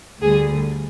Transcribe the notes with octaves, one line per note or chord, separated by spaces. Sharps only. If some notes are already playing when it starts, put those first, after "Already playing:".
D2 D3 G3 G#4